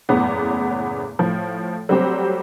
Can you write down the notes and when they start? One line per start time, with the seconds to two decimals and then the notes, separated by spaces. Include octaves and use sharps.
0.09 F#1 E2 A2 C#3 B3
1.19 A2 F3
1.89 F#3 G3 A3 C4 G4 C5